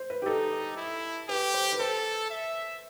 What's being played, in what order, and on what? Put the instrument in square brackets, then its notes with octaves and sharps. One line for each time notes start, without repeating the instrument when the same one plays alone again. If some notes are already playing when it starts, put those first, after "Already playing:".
Already playing: [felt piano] C5
B4
G4
[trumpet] D#4 [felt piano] A4
[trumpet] E4
[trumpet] G4 [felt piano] B4
[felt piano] C5
B4
[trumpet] A4 [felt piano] C5
[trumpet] E5